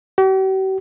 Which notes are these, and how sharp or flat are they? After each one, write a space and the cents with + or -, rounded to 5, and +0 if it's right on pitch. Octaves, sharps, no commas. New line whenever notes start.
G4 -45